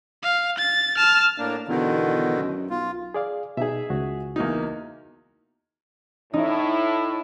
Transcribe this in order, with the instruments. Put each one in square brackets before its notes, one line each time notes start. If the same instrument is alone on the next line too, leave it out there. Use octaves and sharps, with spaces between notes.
[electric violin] F5
A6
A5 F6
[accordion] A2 A#3 D4
[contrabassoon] E2 [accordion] B2 D3 D#3
[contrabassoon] F#2
[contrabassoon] B1 [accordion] F4
[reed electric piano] G#4 D5 F5
[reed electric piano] B2 D#4 [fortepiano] G#4 E5
[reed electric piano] C#2 F#4
[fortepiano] E2 A#3 D#4
[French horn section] A2 E4 [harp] D#4